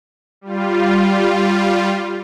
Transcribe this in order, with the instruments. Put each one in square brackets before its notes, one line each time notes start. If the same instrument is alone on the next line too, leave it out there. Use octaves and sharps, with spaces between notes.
[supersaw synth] G3 F4